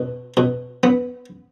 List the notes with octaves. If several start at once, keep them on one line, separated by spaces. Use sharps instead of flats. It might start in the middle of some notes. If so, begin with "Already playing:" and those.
Already playing: B2
B2
B3